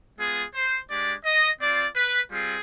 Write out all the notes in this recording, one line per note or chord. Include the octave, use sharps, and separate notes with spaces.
G#3 B3 F4 G#4
C5
G#3 D4 G4 D5
D#5
C4 F4 D5
B4
G3 C4 F4 G#4